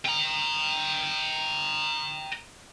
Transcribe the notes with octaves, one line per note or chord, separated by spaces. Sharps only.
G5 A#5